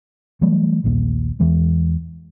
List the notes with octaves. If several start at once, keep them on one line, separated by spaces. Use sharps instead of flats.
E3 F#3 G3 A3
A#1 D#2 A#2
E2 E3 G#3